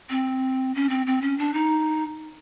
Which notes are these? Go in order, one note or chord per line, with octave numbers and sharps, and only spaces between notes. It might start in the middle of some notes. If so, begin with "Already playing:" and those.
C4
C#4
C4
C4
C#4
D4
D#4